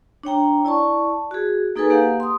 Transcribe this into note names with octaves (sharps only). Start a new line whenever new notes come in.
D4 C#5 G5 A#5
E4 D5 A5 C#6
F#4 G#4
A#3 D#4 G#4 A4 B4 G#5
A#3 G4 F5 F#5
C6 D#6